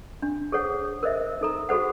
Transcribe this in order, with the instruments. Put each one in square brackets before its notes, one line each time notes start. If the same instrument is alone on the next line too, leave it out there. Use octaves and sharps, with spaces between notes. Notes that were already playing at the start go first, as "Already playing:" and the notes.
[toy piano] D4
G#4 A4 C5 C#5 F#5
A#4 C5 D#5 E5
D#4 A4 A#5
F#4 G#4 A4 C5 F#5